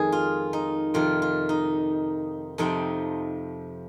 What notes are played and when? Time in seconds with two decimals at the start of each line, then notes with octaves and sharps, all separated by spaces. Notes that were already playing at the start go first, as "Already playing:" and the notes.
Already playing: F2 D#3 G#3 G#4
0.12 F4
0.53 D#4
0.94 F2 C3 D#3 F4
1.22 F4
1.49 D#4
2.58 F2 C3 F3 C4 D#4